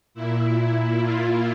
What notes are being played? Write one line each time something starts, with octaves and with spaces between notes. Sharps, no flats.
A#2 E4
F4